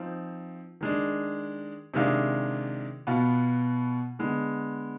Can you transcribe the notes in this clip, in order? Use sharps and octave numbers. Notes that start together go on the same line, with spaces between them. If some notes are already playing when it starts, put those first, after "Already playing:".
Already playing: F3 C4 D#4
D#3 G#3 D4
C3 D#3 G#3 D4 F4
B2 B3 F4
D3 G#3 B3